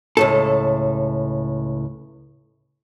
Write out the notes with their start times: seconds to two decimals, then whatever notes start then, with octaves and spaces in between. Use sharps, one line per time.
0.17 C#2 A2 A4